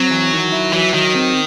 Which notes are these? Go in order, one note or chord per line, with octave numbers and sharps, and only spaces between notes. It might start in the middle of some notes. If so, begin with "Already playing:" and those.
Already playing: F#3 C4
E3
D#3
E4
E3 F#3
D#3 F#3
C4